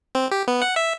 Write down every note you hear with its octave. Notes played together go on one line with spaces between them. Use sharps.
C4
G4
B3
F#5
E5